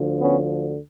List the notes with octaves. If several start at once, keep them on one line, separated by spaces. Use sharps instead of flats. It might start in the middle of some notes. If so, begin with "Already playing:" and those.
Already playing: D2 D3 F3
B3 C#4